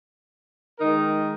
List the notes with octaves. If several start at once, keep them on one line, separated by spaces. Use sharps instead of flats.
D#3 G#3 D#4 A#4